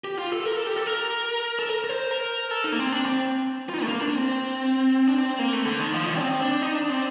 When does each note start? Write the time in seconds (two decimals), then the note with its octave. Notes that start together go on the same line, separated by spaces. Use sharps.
0.04 G4
0.19 F4
0.33 A4
0.45 A#4
0.56 A4
0.67 G4
0.76 A4
0.87 A#4
1.59 A4
1.69 A#4
1.84 A#4
1.89 C5
2.11 A#4
2.51 A4
2.64 D#4
2.72 A#3
2.79 C4
2.92 D4
3.06 C4
3.69 F4
3.74 D#4
3.82 A3
3.88 A#3
4.01 D4
4.15 C4
5.08 D4
5.18 C4
5.39 A#3
5.53 A3
5.65 D3
5.80 D#3
5.94 F3
6.07 D#3
6.17 D4
6.20 C4
6.42 D4
6.62 D#4
6.75 D4
6.89 C4